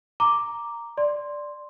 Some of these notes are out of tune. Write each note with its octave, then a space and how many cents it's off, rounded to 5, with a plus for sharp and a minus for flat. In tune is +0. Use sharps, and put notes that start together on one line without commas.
A#5 +0 D6 +0
D5 +0 C6 +0